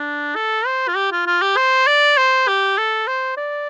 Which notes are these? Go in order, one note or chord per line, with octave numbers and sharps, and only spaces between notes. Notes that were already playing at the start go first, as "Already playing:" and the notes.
Already playing: D4
A4
C5
F4
G4
F4
F4
G4
C5
D5
C5
G4
A4
C5
D5